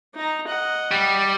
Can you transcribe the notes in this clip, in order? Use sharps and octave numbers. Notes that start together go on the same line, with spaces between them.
D#4 A#5
D#5 F#5
G3